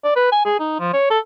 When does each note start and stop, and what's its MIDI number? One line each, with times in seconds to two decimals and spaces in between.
0.04 0.16 74
0.16 0.27 71
0.32 0.40 80
0.45 0.59 68
0.60 0.78 63
0.79 0.93 53
0.93 1.09 73
1.10 1.19 69